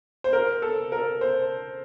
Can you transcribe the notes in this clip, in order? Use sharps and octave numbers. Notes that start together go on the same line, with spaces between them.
C5
A#4
A4
A#4
C5